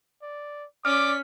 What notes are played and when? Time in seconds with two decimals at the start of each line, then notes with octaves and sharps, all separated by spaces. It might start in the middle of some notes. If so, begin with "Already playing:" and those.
0.22 D5
0.85 C#4 D5 D6 F6 B6